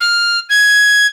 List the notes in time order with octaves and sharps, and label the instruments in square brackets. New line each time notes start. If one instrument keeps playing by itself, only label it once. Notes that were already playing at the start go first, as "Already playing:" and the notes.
[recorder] F6
G#6